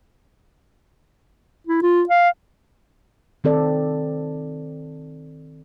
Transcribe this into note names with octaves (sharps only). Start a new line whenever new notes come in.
E4
F4
F5
D#3 C4 A4 D5